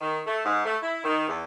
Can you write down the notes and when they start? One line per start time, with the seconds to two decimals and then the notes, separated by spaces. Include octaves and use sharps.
0.01 D#3
0.26 A3
0.45 G#2
0.65 A3
0.82 E4
1.04 D#3
1.28 E2